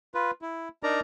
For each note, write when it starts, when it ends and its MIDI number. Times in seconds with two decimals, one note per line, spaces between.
0.14 0.31 65
0.14 0.31 71
0.42 0.69 64
0.83 1.00 62
0.83 1.00 63
0.83 1.00 70
0.83 1.00 74
0.83 1.00 82